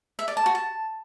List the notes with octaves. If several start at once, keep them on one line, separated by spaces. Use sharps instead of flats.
E5
D5
A5
F#4
A5